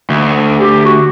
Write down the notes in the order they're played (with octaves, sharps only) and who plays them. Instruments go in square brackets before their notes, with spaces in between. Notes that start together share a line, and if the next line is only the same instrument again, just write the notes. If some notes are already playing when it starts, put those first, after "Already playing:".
[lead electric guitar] D2
[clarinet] G4
F#4